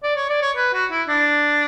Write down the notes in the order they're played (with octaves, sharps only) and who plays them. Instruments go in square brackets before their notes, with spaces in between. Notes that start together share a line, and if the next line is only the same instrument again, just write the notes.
[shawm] D5
C#5
D5
C#5
B4
F#4
E4
D4